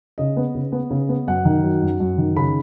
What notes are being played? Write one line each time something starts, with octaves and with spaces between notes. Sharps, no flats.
C#3 D#5
B3
C#3
B3
C#3
B3
F#2 F#5
D#3
F#3
F#2
F#2
D#3
C#3 B5